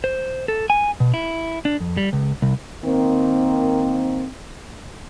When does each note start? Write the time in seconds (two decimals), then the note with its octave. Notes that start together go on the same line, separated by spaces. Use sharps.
0.04 C5
0.48 A4
0.70 G#5
1.00 B2
1.14 E4
1.65 D4
1.80 F2
1.97 G3
2.13 C#2
2.42 C2
2.85 D#3 A#3 C4